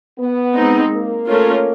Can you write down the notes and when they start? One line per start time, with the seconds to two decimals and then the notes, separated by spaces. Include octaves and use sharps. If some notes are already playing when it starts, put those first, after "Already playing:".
0.18 B3
0.54 G#3 C4 D#4
0.91 A#3
1.26 A3 C#4 F4 A#4